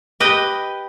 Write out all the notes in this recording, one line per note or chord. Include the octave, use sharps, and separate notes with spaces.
G4 B4 D#5